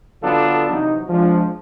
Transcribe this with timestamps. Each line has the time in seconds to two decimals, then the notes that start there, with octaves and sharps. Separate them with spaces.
0.22 D3 F#3 B3 D4 F4 A4
0.71 C3 E3 F#3 D#4
1.09 F3 G#3 D4